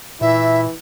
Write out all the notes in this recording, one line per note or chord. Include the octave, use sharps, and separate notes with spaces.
A#2 E3 E4 E5